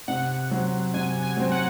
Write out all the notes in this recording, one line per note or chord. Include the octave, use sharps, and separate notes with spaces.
C3 F#5
F#3 C4
C3 G#5
G#5
F#3 C4
F#5